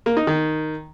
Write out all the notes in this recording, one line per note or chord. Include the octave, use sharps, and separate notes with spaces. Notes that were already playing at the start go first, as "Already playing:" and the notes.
A#3
D#4
D#3